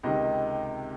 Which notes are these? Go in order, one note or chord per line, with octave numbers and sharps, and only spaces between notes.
C#2 C3 D#3 D#5